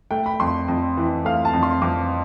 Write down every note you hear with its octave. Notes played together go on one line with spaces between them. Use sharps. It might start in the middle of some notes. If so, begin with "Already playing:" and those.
A3 G5
B5
F2 C6
F2
E3
A3 F5
A5
F2
C6
F2 D6